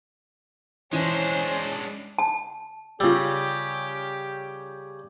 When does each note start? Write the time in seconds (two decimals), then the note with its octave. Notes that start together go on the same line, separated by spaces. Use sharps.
0.93 E3 G#3 C#4 D4 C5
2.18 A5
3.00 C#3 G3 C#4 F4 G4 E6